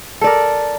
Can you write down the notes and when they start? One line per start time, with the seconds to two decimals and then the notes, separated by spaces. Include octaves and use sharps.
0.21 A4
0.24 D5
0.27 A#4